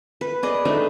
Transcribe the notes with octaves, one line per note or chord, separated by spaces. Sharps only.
B4
G#4 D5 D#5
A3 D4 D#4